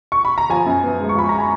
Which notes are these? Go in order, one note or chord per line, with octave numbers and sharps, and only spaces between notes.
C#6
B5
A#5
F3 G#5
F#2
B3
G#3
C#6
F3 B5
A#5
G#5